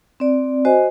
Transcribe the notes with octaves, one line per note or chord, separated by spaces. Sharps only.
C4 D5
F#4 C5 D#5 G#5